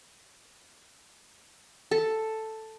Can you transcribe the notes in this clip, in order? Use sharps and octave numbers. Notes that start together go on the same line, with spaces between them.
A4